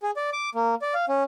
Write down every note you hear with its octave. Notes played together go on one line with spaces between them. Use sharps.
G#4
D5
D6
A#3
D5
F5
C#4